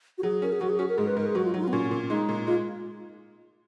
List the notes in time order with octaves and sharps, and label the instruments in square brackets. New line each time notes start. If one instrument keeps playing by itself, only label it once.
[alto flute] F#4
[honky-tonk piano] F#3 [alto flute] G#4
[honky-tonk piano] C#4 [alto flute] A#4
[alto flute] G#4
[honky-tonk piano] F#3 [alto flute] F#4
[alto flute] G#4
[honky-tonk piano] C#4 [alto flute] F#4
[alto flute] A#4
[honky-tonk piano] G#2 [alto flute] G#4
[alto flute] B4
[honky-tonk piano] G#2 [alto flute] A#4
[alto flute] G#4
[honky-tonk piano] F#3 [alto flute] F#4
[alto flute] F4
[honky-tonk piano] F#3 [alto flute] D#4
[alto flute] F4
B3
[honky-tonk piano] A#2 [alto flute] C#4
[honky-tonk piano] A#2
[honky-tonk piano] G#3 [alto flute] D#4
[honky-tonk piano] A#2
[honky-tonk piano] G#3 [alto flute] F4